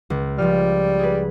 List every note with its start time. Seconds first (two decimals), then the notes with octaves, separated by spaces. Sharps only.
0.10 C#2
0.38 C#2 F3 G3 F6
0.99 G#4 B4